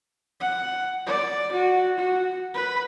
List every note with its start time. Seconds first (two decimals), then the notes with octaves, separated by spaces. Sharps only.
0.40 F#5
1.06 D5
1.53 F#4
1.98 F#4
2.54 B4